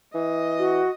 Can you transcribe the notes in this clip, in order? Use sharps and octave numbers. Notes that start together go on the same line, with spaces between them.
E3 D#5
F#4